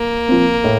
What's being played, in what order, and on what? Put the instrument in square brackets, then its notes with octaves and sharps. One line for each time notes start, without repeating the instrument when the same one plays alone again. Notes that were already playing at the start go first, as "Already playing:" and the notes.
Already playing: [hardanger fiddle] A#3
[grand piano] F3 C4
A2